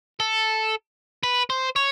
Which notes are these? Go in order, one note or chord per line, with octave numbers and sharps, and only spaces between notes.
A4
B4
C5
C#5